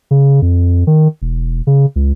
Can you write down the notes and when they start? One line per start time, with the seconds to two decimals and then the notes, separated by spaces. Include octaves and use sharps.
0.11 C#3
0.42 F2
0.87 D#3
1.22 E1
1.67 C#3
1.96 C#2